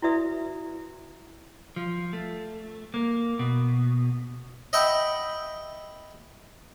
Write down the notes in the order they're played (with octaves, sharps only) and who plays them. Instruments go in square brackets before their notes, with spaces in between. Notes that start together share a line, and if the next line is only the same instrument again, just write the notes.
[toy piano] E4 F#4 B4 D5 E5 D#6
[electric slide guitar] F3
A3
A#3
B2
[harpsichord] D#5 E5 F#5 G5 B5 C#6